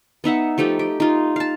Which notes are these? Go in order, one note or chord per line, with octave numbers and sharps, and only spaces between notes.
B3 D#4 E5 F#5
F3 A3 D#4 G4
G4
D#4 F4
F5 A5